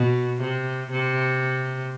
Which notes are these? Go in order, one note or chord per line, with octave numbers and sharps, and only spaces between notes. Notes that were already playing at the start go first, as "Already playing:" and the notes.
Already playing: B2
C3
C3